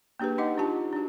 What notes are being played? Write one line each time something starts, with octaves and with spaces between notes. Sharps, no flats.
A#3 D4 G4 G#4 B4
D#4 D#5 F#5 D6
D4 F4 G4 A5
D4 F#4